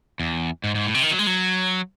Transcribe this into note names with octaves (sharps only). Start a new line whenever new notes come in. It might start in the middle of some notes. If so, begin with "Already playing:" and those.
E2
G#2
G#2
A2
C3
D#3
F#3
G#3
F#3